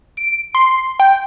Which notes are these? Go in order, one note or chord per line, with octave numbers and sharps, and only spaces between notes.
D7
C6
G5